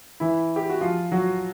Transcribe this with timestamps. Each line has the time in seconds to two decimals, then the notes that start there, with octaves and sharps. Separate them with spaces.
0.20 E3 E4
0.56 G4
0.69 F#4
0.81 F3 F4
1.12 F#3 F#4